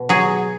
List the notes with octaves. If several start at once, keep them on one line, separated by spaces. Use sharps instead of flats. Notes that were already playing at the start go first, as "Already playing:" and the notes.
Already playing: B2
F#3 G#4